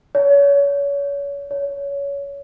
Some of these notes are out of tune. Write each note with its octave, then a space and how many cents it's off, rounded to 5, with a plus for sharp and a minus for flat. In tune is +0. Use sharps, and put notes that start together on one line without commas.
C#5 +30
C#5 +20